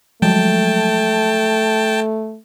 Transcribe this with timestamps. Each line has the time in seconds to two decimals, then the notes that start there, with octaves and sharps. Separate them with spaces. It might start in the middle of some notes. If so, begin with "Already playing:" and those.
0.22 F3 F#3 G#3 A3 G5 A5